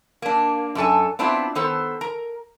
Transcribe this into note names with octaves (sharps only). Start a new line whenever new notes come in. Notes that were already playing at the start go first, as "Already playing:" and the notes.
A#3 D4
F#2 D4 A4 G#5
B3 C4 D4 E4 F4
D#3 B3 A4 C5
A#4 A#5